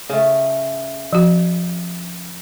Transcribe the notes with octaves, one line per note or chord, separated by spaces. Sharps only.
C#3 A3
F3 F#4